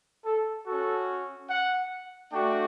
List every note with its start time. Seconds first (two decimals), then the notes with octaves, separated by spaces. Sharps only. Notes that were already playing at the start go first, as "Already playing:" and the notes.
0.25 A4
0.67 C#4 F#4 A4
1.50 F#5
2.32 A3 D4 F#4 G5